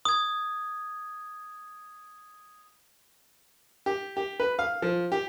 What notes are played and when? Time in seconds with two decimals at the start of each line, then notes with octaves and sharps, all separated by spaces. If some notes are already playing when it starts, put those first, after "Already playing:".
0.05 D#6 G#6
3.86 G4
4.17 G4
4.40 B4
4.59 F5
4.82 F3
5.12 G4